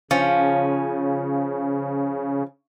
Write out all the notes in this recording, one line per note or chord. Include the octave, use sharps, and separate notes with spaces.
C#3 F3 C#4